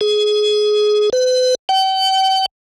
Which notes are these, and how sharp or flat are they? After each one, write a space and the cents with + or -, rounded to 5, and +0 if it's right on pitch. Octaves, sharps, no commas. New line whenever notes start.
G#4 +20
B4 +45
G5 -40